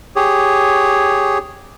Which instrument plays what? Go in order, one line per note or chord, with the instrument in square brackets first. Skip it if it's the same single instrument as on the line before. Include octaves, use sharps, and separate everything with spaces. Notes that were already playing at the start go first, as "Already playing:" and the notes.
[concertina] G4 G#4 C#5